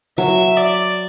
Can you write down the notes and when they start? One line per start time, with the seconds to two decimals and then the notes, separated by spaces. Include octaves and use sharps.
0.18 F#3 E5
0.57 D5